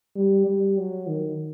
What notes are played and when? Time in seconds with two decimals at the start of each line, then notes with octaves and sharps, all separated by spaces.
0.16 G3
0.46 G3
0.78 F#3
1.07 D#3